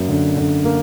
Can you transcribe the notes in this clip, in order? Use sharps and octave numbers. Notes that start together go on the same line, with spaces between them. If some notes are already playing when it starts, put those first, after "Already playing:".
Already playing: F#2 F#3 A#3
D3
D3
A#3